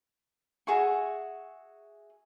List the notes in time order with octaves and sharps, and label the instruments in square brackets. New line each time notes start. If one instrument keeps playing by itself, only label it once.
[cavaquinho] F#4 G#4 E5 C#6